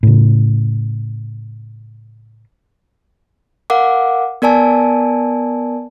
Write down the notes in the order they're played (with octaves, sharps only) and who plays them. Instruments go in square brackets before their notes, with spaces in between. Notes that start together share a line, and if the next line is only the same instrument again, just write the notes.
[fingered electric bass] A2 C#3
[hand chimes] A#4 F5 F#5 D6
B3 A#4 D5 G#5 A5